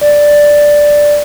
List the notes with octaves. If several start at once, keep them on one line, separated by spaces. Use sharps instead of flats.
D5